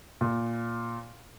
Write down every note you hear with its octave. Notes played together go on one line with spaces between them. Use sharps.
A#2